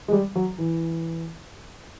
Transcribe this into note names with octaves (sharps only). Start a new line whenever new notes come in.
G#3
G3
F#3
E3